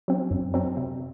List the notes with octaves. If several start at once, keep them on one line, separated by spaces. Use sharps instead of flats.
F#3 C4
F#2
F#3 C4
C3